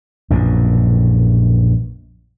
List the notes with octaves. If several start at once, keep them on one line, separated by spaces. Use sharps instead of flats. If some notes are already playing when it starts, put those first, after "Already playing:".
A#1 F#2 B2